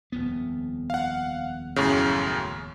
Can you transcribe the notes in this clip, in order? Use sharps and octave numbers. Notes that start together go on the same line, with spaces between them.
D#1 F2 B3
F5 F#5
F#2 A2 C#3